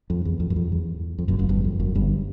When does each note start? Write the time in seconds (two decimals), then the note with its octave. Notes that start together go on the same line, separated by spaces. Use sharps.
0.10 F2
0.25 E2
0.40 F2
0.50 F#2
0.56 F2
0.72 E2
1.18 F2
1.28 F#1 F#2
1.39 F#1 F#2
1.49 G1 G2
1.65 F2
1.79 F#1 F#2
1.95 G1 G2